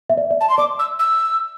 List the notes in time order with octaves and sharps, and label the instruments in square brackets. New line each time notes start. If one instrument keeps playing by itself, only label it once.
[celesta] E5
D5
D5
[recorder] A5
C6
[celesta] D5 [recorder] D6
[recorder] E6
E6